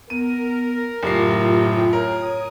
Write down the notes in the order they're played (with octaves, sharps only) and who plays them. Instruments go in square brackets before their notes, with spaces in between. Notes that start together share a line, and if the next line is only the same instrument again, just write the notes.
[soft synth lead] B3 [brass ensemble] A#4 [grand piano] D#7
[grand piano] F#1 C7 [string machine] A2 F4 G5 [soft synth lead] G4
[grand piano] A#4 [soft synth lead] C#5 [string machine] D#6